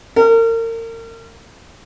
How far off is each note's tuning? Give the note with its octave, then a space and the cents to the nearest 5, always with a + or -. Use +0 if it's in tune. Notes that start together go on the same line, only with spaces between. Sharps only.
A#4 -35